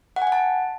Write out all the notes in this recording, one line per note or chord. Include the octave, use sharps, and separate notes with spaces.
F#5
G#5
F#5
A5